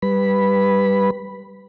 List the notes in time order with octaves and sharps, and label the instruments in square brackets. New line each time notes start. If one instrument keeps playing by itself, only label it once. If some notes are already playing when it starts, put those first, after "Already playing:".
[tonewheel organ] G3 B4 B5